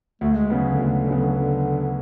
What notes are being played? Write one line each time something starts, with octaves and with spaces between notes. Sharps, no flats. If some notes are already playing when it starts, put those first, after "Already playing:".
D2 A3
G#3
C#3 F#3 B3
D3
D2
C#3 F#3 B3
D3